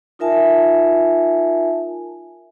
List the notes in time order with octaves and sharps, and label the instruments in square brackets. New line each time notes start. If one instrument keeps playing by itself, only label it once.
[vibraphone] D#4 F4 A#4 E5 G#5 A5